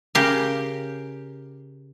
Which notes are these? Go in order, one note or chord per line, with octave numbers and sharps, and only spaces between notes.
C#3 G4 A#4